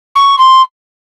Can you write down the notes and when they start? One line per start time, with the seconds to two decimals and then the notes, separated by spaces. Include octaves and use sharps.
0.15 C#6
0.38 C6